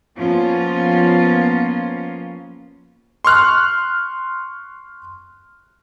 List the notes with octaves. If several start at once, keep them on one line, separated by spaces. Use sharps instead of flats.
F3 A#3 B3 C#4 F4
C6 C#6 F6 F#6